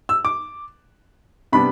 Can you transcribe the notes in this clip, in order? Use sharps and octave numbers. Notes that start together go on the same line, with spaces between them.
E6
D6
C3 G3 B3 D4 B5